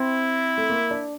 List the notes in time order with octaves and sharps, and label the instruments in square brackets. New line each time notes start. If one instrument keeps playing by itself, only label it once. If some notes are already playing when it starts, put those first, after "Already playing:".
Already playing: [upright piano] C4 [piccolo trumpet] E4
[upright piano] A3
A#3
D4